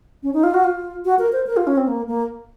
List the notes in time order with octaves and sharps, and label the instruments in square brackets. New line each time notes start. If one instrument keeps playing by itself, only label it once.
[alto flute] C#4
D#4
F4
F#4
F4
F#4
A#4
C5
A#4
F4
C#4
C4
A#3
A#3